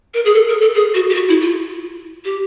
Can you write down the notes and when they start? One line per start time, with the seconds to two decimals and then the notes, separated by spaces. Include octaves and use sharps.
0.14 A#4
0.25 G#4
0.34 A4
0.48 A#4
0.61 A4
0.75 G#4
0.94 F#4
1.10 G4
1.15 F#4
1.29 E4
1.41 F4
2.25 G4